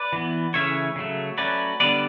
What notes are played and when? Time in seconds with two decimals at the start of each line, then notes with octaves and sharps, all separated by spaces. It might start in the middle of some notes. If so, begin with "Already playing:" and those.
Already playing: B4 D5
0.13 E3 B3
0.54 C#3 E3 A3 C#4 C#5 E5
0.96 C#3 F#3 A3
1.38 F#3 A3 C#4 B4 D5
1.80 D3 G3 B3 B4 D5